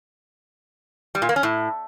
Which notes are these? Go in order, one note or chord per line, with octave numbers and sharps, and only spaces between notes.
G3
A#2
A#3
C#4
A2